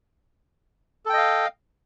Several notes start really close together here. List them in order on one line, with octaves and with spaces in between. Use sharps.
A4 G5 D#5 F5